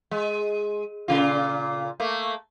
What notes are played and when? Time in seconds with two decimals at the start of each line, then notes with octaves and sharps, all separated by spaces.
0.11 G#3
1.08 A#2 C#3 F4
2.00 A3 A#3